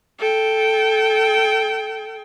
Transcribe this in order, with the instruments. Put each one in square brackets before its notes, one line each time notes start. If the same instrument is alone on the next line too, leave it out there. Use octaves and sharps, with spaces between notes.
[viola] A4 G5